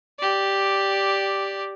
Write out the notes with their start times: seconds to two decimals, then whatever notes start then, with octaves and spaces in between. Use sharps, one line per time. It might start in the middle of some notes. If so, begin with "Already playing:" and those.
0.19 G4 D5